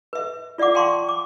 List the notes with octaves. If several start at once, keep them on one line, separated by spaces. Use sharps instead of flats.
B4 E5
F4 D5 E5 F#5 D6
F5 G5 A5 C6 C#6
D6